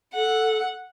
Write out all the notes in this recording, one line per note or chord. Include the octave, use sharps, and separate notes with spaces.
A4 F#5